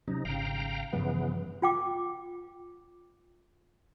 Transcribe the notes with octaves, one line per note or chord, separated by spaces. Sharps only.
C3 F#3 C#4 D#4
G#1 C#3 F5 G5 A#5
G2 C#3 E3 F3 G3 B3
F4 G5 D6